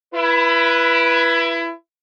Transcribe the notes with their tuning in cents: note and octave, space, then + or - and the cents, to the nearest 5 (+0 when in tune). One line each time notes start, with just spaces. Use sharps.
E4 +25 B4 -10